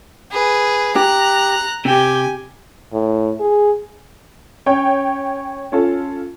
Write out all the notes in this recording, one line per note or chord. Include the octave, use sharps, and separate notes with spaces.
G#4 B4
G4 A#5 F#6
C3 G4 G5 G#5
A2
G#4
C#4 C#5 G5
C#4 F4 A4